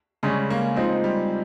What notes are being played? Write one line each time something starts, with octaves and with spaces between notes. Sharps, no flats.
C#3 G3 G#3 C#4
A#3
F3 G#3 C4 D#4
G3